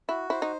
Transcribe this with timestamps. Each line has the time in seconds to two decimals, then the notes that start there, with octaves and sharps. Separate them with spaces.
0.09 E4 F#4
0.30 E4 C5
0.42 D#4